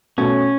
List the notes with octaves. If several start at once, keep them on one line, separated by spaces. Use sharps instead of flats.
B2 A3 C#4 F#4 C#5